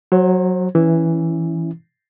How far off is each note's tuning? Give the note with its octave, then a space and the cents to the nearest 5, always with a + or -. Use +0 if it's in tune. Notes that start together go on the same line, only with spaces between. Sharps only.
F#3 +0 C5 +40
E3 +0 C#4 +0 E4 +0